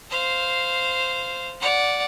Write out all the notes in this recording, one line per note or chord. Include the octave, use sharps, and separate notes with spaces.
C5 F5
D5 F#5